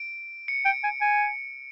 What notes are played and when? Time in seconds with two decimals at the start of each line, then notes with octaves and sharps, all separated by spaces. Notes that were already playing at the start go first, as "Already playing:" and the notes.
Already playing: D7
0.48 C#7
0.65 G5 D7
0.84 G#5
1.01 G#5